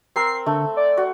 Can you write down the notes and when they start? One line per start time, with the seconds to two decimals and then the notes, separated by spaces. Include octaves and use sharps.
0.16 C4 A#4 E6 C7
0.46 D3 A3
0.77 D5
0.97 F#4